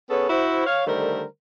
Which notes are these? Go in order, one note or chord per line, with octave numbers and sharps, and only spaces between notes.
B3 C#4 G#4 A4 B4 C#5
E4 F#4 C5
C#5 F5
D3 D#3 G3 A3 A#4 C5